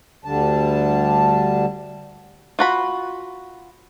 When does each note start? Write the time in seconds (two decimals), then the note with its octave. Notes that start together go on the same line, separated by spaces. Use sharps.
0.25 D2 D3 G3 D4 A5
2.59 F4 F#4 B5